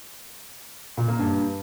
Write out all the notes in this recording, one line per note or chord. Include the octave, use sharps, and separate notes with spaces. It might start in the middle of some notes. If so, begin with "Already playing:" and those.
A#2
A#3
G2